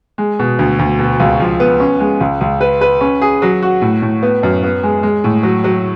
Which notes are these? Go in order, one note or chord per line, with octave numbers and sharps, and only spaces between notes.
G#3
B2
D2
D2
B2
C#2
F3
B3
C#4
G#3
C#2
C#2
B4
B4
C#4
G#4
F#3
F#4
A2
A2
B3
F#2
B3
G#3
G#3
A2
F#3
F#3